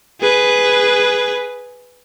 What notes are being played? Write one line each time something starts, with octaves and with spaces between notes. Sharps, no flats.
G#4 B4